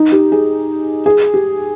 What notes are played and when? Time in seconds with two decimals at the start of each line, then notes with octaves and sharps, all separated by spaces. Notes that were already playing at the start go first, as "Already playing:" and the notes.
Already playing: D#4
0.12 G4
0.32 G#4
1.06 G#4
1.34 G4